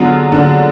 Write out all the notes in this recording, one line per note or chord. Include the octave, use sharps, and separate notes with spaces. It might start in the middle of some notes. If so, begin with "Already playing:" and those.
Already playing: D3 F#3 B3 F4 G#4
D3